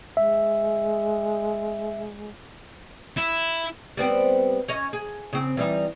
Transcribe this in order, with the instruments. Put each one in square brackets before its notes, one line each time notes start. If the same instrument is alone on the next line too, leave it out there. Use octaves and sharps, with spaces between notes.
[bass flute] G#3 [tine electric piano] E5
[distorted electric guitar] E4
[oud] G3 B3 C4
C#4 C#5 D#5
G#4
C#3 C4
E3 G3 D#4